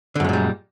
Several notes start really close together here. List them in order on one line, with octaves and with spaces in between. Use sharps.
D3 F#2 G#3 A#2 G3